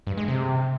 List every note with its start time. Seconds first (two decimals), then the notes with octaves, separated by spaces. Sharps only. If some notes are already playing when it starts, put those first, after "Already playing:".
0.07 G2
0.17 G#3
0.28 C3